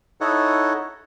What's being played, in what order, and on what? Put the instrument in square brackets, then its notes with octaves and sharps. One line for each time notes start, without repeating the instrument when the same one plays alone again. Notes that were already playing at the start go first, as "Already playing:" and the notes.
[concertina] D#4 E4 A4 C#5 D#5 F#5